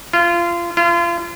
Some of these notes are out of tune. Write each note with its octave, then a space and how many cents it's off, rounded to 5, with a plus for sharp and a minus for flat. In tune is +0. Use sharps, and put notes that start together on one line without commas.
F4 -25
F4 -35